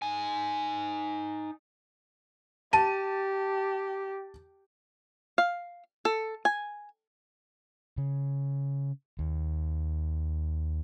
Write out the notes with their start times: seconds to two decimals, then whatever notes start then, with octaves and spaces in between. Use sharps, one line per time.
0.02 D#4 G#5
2.73 G4 A5 D#7
5.38 F5
6.05 A4
6.45 G#5
7.98 C#3
9.19 D#2